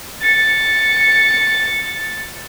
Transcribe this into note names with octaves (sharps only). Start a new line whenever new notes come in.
A6 C#7